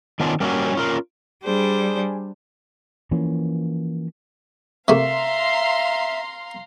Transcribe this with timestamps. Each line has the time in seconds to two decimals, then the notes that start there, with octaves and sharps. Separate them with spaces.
0.20 D#3 B3 C#4 D4 F4
0.40 G3 A#3 C#4 D#4 F#4 G4
0.75 C#4 F4 A#4
1.44 G3 D4 G#4 C5
3.11 E3 F3 A#3 C#4
4.88 C3 A3 A#3 E5 F5 A#5 C6